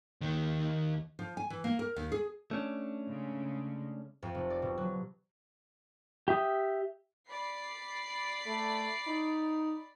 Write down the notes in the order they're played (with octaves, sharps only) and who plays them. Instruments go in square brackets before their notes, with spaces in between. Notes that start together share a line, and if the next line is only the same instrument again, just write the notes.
[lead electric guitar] D#2 D#3
[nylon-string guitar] F3
G#5
E3
A#3
A#4
D#2
G#4
[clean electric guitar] A3 C#4 D4
[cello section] C#3 G#3
[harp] F2
F1
D5
B2
F#3
[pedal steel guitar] G4 E5 D#6
[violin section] D5 B5 C7
[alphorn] A3
D#4